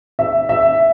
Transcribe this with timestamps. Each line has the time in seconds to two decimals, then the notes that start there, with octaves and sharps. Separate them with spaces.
0.19 E5
0.49 E5